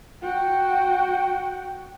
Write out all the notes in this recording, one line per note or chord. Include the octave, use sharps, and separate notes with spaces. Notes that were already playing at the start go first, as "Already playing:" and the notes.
F#4 G5